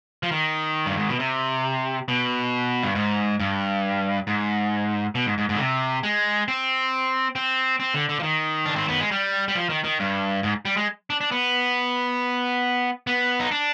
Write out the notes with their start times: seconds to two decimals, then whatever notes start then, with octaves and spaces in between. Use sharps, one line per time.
0.23 F3
0.32 D#3
0.86 G2
0.97 G#2
1.09 B2
1.20 C3
2.08 B2
2.83 G2
2.95 G#2
3.40 G2
4.27 G#2
5.15 B2
5.26 G#2
5.38 G#2
5.49 G#2
5.55 D3
5.59 C3
6.03 G#3
6.48 C4
7.36 C4
7.80 C4
7.94 D3
8.09 D3
8.20 F3
8.23 D#3
8.66 D4
8.76 C4
8.88 B3
9.00 G#3
9.11 G3
9.48 G3
9.55 F3
9.69 D#3
9.84 D#3
10.00 G2
10.43 G#2
10.65 G3
10.77 G#3
11.10 D4
11.21 D4
11.32 B3
13.07 B3
13.40 D#4
13.51 D4